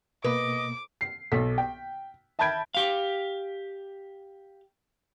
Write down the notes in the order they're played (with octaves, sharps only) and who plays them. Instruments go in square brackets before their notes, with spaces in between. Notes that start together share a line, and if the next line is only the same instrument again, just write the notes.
[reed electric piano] B2 A#3 [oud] B4 [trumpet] D#5 [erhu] D6
[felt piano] C7
B1 A4 B6
G5
E5 A5 B5 G6 G#6 D7
[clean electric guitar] G4 F5